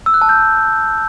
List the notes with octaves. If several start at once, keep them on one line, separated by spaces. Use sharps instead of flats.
E6
F#6
A5
G6